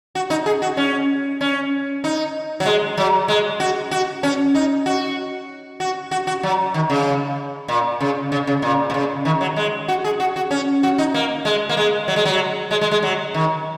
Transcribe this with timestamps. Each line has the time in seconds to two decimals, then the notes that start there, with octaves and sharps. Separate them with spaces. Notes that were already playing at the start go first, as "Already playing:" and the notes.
0.15 F#4
0.30 D#4
0.46 G#4
0.62 F#4
0.77 C#4
1.41 C#4
2.04 D#4
2.60 F#3
2.65 G#3
2.97 F#3
3.28 G#3
3.60 F#4
3.91 F#4
4.23 C#4
4.55 D#4
4.86 F#4
5.80 F#4
6.11 F#4
6.27 F#4
6.43 F#3
6.74 D#3
6.90 C#3
7.68 A#2
8.00 C#3
8.32 C#3
8.47 C#3
8.62 A#2
8.90 A#2
8.94 C#3
9.25 D#3
9.41 F#3
9.56 G#3
9.88 F#4
10.04 G#4
10.20 F#4
10.36 F#4
10.51 C#4
10.83 F#4
10.98 D#4
11.14 A#3
11.45 G#3
11.69 A#3
11.77 G#3
12.08 F#3
12.16 G#3
12.25 F#3
12.71 G#3
12.81 G#3
12.91 G#3
13.03 F#3
13.34 D#3